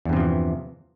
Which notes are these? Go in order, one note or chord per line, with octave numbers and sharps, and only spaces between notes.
E2 G2 C3 E3 F3